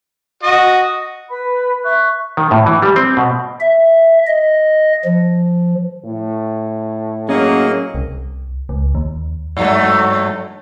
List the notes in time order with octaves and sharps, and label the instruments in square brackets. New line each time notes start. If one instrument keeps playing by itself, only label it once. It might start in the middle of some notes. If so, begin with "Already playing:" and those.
[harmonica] F#4 D#5
[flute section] B4 B5
E5 C#6 F#6
[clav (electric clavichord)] D#3
A2
E3
G3
C4
B2
[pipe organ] E5
D#5
F3
[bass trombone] A2
[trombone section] F#3 A#3 [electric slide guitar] C#4 [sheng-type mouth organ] G#4 D#5
[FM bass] C2
C#2
D#2
[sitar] G2 F#3 A3